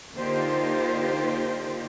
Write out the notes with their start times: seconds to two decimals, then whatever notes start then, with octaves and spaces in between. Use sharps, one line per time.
0.15 D3 A#3 D#4 F4 G4 C5